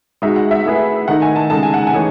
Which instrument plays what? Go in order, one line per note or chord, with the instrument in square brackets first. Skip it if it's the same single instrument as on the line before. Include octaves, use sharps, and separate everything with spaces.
[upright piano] G#3 D#4 F#4 [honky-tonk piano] E5
[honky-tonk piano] F#5
E5
[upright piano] A3 E4 G#4 B4
[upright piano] D#3 A3 D#4 [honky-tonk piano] F#5
[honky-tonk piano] G#5
A5
[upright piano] C#3 G#3 D#4 A4 [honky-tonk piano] A5
[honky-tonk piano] G#5
F#5
G#5
[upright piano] E3 A3 D#4 G#4 C#5